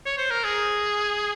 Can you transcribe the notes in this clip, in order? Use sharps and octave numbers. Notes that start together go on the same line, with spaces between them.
C#5
C5
A#4
G#4